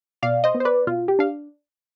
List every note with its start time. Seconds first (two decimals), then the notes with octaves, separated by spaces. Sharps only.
0.23 B2 D5 F5
0.44 C5 D#5
0.55 B3
0.60 C5
0.65 B4 D5
0.87 B2 F4
1.08 G4
1.19 D4 F5